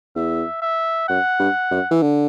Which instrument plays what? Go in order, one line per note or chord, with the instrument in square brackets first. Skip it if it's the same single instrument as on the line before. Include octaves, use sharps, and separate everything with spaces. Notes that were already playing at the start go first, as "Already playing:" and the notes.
[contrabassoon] E2 [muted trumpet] E5
[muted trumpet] E5
[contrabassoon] F#2 [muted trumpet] F#5
[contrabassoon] G2
F#2
E3
D3